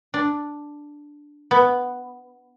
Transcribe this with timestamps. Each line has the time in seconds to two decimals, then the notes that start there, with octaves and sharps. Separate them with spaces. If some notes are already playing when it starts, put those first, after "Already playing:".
0.14 D4
1.51 B3